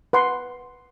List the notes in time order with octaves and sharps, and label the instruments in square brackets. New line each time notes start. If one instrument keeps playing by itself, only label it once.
[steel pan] B4 F#5 C6